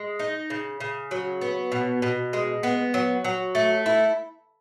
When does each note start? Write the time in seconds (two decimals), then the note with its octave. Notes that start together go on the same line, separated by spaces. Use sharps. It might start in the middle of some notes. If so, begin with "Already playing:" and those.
Already playing: G#3
0.19 D#4
0.50 C#3
0.80 C#3
1.11 F#3
1.41 B3
1.72 B2
2.02 B2
2.33 G#3
2.63 B3
2.94 F#3
3.24 F#3
3.55 A3
3.86 E4